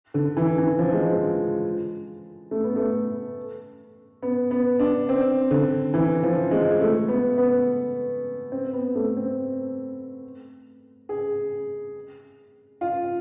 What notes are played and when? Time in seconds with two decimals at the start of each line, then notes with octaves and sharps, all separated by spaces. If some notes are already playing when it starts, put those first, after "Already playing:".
0.14 D3
0.37 E3
0.58 E3
0.79 F3
0.92 G#3
1.04 F3
2.51 A3
2.64 B3
2.76 A3
4.22 B3
4.51 B3
4.80 D4
5.09 C4
5.51 D3
5.94 E3
6.23 F3
6.51 G#3
6.80 A3
7.08 B3
7.38 B3
8.52 C4
8.73 B3
8.95 A3
9.17 C4
11.09 G#4
12.81 F4